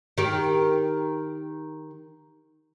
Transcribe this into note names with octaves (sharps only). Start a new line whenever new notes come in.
D#3 G4